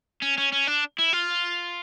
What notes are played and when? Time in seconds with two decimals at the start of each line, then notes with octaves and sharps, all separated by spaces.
0.22 C#4
0.38 C#4
0.52 C#4
0.67 D4
0.98 E4
1.13 F4